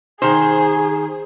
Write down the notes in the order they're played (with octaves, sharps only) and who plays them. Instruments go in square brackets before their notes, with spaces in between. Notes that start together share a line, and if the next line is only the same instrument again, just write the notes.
[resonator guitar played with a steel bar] D#3 C5 [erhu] G#4